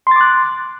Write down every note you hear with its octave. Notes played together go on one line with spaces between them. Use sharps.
C6 D6 F#6 A6